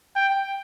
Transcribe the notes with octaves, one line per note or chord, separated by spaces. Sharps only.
G5